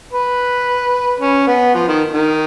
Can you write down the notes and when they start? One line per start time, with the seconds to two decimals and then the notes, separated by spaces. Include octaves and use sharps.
0.13 B4
1.20 C#4
1.47 B3
1.75 F3
1.88 D#3
2.14 D#3